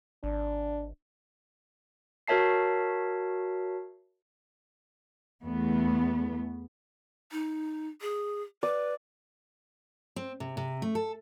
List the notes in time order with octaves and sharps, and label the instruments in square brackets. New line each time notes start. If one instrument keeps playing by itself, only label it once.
[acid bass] G#1 [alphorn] D4
[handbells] F#4 A#4 C#5 E5 A5 C7
[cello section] E2 A3 B3
[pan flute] D#4
G#4
[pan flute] B4 [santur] D5
[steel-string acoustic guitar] C4
C3
C3
A3
A4